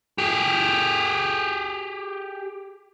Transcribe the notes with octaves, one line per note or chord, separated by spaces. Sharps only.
G4 G#4